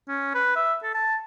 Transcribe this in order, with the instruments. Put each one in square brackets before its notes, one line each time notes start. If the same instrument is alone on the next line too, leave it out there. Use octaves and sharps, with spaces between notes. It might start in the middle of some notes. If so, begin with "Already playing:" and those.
[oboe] C#4
B4
E5
A4
A5